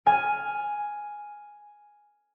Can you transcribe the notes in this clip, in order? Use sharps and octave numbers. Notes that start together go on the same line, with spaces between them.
G#5 F6 D#7